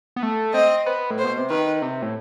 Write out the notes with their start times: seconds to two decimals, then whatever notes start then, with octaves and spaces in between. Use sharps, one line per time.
0.16 B3
0.23 A3
0.54 C4 D#5
0.86 B3
1.11 A2
1.18 C5
1.24 B2
1.38 C3
1.50 D#3 B4
1.82 C3
2.02 A2